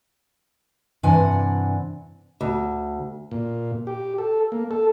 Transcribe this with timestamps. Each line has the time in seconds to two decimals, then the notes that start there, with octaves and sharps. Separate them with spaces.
1.03 G2 C3 E3 D4 F#5 G#5
2.41 D2
3.31 A#2
3.87 G4
4.18 A4
4.52 A#3
4.71 A4